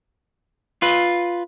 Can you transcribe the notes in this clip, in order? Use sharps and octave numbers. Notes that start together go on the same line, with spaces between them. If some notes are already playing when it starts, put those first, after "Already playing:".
F4 B4